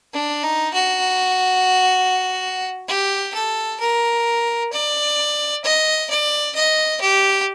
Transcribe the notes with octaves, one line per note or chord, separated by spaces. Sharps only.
D4
D#4
F#4
G4
A4
A#4
D5
D#5
D5
D#5
G4